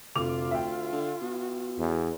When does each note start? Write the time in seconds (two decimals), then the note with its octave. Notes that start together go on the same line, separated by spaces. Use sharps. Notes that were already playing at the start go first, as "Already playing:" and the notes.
0.15 F1 D2 F4 D6 F7
0.51 E5 G5
0.92 D3
1.21 B2
1.79 E2